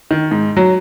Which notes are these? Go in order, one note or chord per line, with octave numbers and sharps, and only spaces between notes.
D#3
G#2
F#3